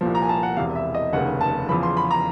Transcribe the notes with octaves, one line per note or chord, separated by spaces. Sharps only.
C2 A#2 F3
A#5
G#5
A5
F#5
E1 E2 C3 F5
E5
D#5
F1 D#2 C#3 F#5
A5
E2 C#3 F3 B5
C6
B5
A#5